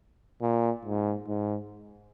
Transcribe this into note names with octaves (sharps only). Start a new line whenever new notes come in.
A#2
G#2
G#2